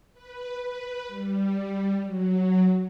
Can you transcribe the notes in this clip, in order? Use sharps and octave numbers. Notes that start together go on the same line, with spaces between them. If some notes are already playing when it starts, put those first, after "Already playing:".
B4
B4
G3
F#3